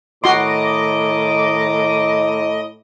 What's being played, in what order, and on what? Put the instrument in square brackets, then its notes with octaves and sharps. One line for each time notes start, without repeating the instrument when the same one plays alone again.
[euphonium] A2 [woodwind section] D#3 A#5 D6 [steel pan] F#4 C6 [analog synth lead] D#5